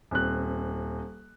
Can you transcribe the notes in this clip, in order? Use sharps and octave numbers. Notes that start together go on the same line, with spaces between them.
D#1 C4 F#6